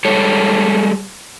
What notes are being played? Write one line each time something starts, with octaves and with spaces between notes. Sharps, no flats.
G3 G#3 A4 C#5